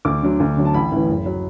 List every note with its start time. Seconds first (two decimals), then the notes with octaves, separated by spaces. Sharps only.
0.05 D2 D6
0.22 D3 F#3
0.40 D2
0.57 D3 F#3
0.65 A5
0.74 A1 B5
0.92 A2 E3
1.09 F#1
1.26 F#3